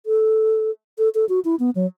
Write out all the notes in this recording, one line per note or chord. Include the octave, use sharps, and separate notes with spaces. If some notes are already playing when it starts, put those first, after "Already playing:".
A4
A4
A4
F#4
E4
B3
F#3